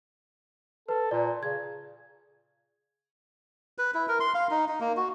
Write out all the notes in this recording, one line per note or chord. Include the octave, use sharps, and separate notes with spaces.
A4 B4
A#2 D5
C#3 G#6
B4
E4
A#4
C6
F5
D#4
D#4
A#3
F#4